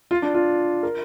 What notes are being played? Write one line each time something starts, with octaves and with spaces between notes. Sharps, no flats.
F4
D4
F4
A#4